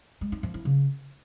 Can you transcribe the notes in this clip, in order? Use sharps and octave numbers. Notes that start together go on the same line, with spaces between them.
G#3
D#4
F3
E4
C#3